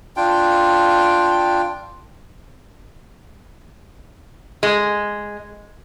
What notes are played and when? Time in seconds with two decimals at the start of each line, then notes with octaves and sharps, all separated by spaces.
0.17 D4 F4 G5
4.63 G#3